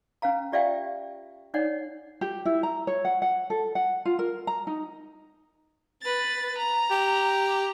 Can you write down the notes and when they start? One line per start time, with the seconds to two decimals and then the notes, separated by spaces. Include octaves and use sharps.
0.22 C#4 B4 F5 A#5
0.52 F4 G4 D5 E5 F5 G5
1.54 D4 D#4 C#5 D5 F#5
2.21 G4
2.45 E4
2.63 A#5
2.87 C#5
3.05 F#5
3.22 F#5
3.50 A4
3.75 F#5
4.05 F4
4.19 A#4
4.47 A#5
4.67 D#4
6.02 B4 A6
6.58 A#5
6.91 G4